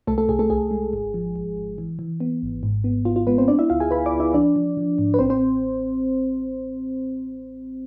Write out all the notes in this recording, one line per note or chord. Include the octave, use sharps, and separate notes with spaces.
C2 A3 A4
A3 A4
C2 G#4
A3 A4
C2 G#4
G#3
G#1
F3
G#1
G#1
E3
E3
B3
G#1
G#2
B3
B3 F4
F4
G#3 B3 B4
C4 C5
B3 D4 D5
E4 E5
D2 F4 F5
G#4 G#5
D2 B4 B5
D5 D6
D2
E4 E5
F3 D4 D5
F3
F3
G#2
B4
A1 C4 C5
C4 C5